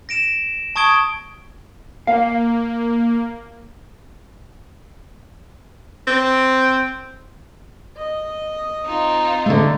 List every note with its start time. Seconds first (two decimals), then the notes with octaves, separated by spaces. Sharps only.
0.09 A#6 D7 E7
0.76 A5 C#6 D#6 G#6 D7 G7
2.07 A#3 F5
6.07 C4
7.97 D#5
8.83 C4 D#4 F4
9.46 D3 A3